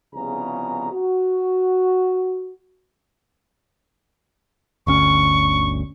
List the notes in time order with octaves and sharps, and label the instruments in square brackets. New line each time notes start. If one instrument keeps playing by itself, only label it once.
[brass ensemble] C2 C#3 F3 B3 G#4 A#5
F#4
[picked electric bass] G1 D2 C#4 [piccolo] C#6